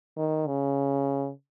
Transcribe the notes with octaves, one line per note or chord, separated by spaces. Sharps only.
D#3
C#3